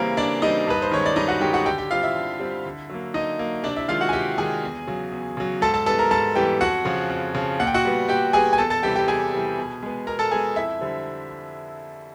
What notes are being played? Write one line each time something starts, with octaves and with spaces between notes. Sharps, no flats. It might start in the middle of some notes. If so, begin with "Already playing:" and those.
Already playing: C#3 E3 G3 A#3 C4 A#4
C#3 D4 D5
E3 G3 C4 D#4 D#5
G2 B4
C5
D#3 G#3 C#4 C#5
D5
G2 D#4 D#5
F#4 F#5
D#3 G#3 C#4 G4 G5
F#4 F#5
D3 G4 G5
G4 G5
G3 C4 F4 F5
E4 E5
D3
G3 C4
D3
F#3 A#3
D3 D#4 D#5
F#3 A#3
C3 D4 D5
E4 E5
D#3 G#3 F4 F5
F#4 F#5
G#5
C3 G4 G5
D#3 G#3 G#4 G#5
E2
C#3 F#3
E2
C#3 F#3
G#2 A4 A5
A4 A5
E3 G3 B3 A4 A5
A#4 A#5
G#2 A4 A5
E3 G3 B3 G4 G5
F2 F#4 F#5
C#3 F3
F2
C#3 F3
A#2 F#5
G5
F#4 F#5
G3 B3
A#2 G4 G5
G3 B3 G#4 G#5
G#5
E2 A4 A5
A4 A5
C3 E3 G3 G4 G5
G4 G5
E2 G#4 G#5
C3 E3 G3
B2
G#3 B3
B2 A#4 A#5
A4 A5
G#3 B3 G#4 G#5
F2 E4 E5
D3 G3 C4